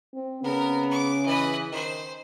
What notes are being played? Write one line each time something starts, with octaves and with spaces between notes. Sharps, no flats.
C4
C#3 B3 A#4
D6
E3 B4 D#5
D#3 C5